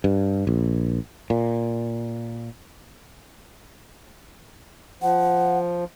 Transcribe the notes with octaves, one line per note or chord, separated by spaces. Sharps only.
G2
A#1
A#2
F3 F#5